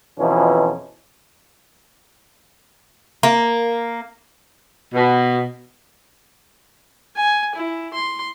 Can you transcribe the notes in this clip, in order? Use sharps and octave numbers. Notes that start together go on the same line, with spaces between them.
F2 B2 E3 F3 C#4 D#4
A#3
B2
G#5
E4
C6